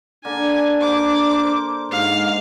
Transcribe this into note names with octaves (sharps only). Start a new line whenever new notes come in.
D3 A#3 D4 G#5
A#3 C5 D6
C5 C6
G#2 F5